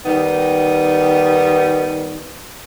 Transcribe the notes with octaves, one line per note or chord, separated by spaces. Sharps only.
D#3 G3 B3 D#4